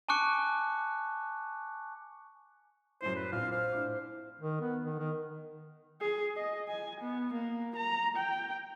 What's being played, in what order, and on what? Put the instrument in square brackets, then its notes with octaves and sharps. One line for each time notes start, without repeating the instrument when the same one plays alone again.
[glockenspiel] G#5 A5 C#6 D6 F#6 C#7
[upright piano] F#2 A2 [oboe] C5
[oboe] B4
[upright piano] A#1 C4 [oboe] F5
[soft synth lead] C5 [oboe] F5
[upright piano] A2 D4 D6
[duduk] D#3
B3
D#3
D#3
[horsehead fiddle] G#4
D#5
G#5
B3
A#3
A#5
G5